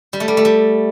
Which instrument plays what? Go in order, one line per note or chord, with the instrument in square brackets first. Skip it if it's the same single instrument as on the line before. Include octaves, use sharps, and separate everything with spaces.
[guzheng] G3
A3
G3
A3
G3